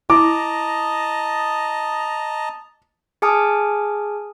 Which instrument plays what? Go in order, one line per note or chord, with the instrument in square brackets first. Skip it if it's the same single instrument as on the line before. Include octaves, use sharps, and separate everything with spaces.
[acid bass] E4 [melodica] D#5 A5 A#5 [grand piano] D6
[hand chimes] G#4 G#5 A5 D#6 F6